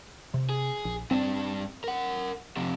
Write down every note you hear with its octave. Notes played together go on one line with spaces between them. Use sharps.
C3
G#4
A#1
G2 C4 D4
A#4 F#5
F2 C3